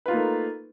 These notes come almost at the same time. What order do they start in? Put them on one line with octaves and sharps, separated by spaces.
B4 F4 D#4 A#3 A3